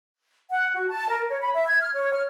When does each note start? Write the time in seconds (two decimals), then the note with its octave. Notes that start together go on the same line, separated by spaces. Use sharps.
0.51 F#5
0.74 F#4
0.89 A5
1.09 A#4
1.30 C#5
1.41 B5
1.54 E5
1.68 G#6
1.81 F6
1.94 C#5
2.14 F6